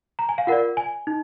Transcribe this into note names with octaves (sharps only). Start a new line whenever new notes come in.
A#5
G#5
F5
F4 A#4 D5 F#5
G#5
D#4